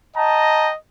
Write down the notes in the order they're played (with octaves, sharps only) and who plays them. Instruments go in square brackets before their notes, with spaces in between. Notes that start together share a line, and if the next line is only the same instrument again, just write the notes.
[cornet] D#5 [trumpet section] G5 A5 A#5